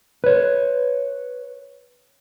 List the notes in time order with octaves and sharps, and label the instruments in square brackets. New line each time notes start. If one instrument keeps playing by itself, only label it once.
[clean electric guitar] B4 C#5